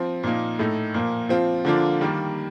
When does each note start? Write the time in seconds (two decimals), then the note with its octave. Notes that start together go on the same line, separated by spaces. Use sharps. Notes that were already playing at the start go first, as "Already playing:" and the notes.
Already playing: F3 C4
0.23 A#2 F3 A#3 D#4
0.59 A2 A3 D#4
0.94 A#2 F3 A#3
1.29 F3 C4 F4
1.65 D3 F3 A#3 D4 F4
2.01 D#3 G3 A#3